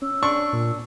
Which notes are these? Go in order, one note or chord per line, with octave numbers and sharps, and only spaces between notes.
C#4 E6
D4 C#6
A#2